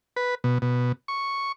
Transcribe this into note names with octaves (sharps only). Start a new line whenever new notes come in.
B4
B2
B2
C#6